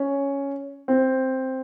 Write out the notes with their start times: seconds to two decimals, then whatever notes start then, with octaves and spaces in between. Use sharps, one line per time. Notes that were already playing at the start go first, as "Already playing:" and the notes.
Already playing: C#4
0.88 C4